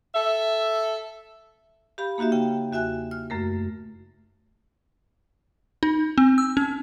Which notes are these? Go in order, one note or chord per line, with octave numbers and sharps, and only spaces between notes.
A4 E5
G4 F5 B5
A#3 D#4 F#4 G4 E5
C#3 G5
E2 F#4 E5 G#5 F#6
F6
F#2 A3 A#4
D#4
C4
E6
C#4